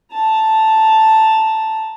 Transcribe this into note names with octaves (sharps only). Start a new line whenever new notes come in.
A5 A#5